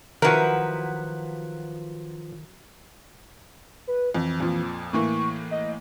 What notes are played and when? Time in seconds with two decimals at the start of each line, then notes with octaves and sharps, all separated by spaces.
0.22 D#3 F3 F#3 E4 F#4 A#4 B4
3.87 B4
4.15 F2 E3
4.40 F2 A#2 F3
4.93 A2 E3 A#3 C#6
5.51 D#5